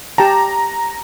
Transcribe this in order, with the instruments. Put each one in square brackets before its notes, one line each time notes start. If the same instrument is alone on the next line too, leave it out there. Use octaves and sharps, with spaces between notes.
[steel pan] G4 G5 A5 [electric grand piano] A#5